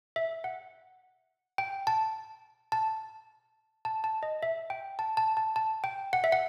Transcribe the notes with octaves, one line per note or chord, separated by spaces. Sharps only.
E5
F#5
G5
A5
A5
A5
A5
D#5
E5
G5
A5
A5
A5
A5
G5
F#5
E5
F#5